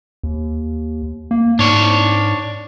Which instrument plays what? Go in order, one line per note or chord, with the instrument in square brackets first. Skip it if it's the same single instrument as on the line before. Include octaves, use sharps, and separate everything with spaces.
[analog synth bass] D#2
A#3
[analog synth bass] G#2 [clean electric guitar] D4 C#5